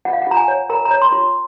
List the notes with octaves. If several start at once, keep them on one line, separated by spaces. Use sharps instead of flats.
F4 F#5
F5
F#5
F4 A#5
G#5
C#5
A#4 A#5
A#5
C#5
C6
F4